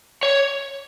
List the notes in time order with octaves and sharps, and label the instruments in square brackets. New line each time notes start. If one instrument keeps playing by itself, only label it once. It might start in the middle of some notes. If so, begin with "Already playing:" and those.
[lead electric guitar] C#5